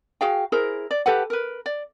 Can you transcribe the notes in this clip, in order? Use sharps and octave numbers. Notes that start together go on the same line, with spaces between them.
F#4 G#4 F5 G5
E4 G#4 A#4 C5
D5
G4 A4 B4 F#5
A#4 B4
D5